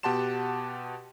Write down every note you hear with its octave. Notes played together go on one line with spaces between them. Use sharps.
B2 G4 F#5 A5 C6 E7